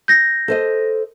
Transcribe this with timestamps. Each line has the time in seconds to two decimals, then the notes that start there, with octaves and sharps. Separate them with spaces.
0.08 G6 A#6
0.48 A4 C5 D#5